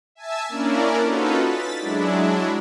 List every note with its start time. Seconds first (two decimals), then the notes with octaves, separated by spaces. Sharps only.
0.15 E5 G#5 A5 E6
0.49 A#3 C#4 D4 E4 A#4 D5
1.04 C#4 D#4 F4 F#4 A4 B4
1.43 A6 B6
1.80 F#3 G#3 D4 E4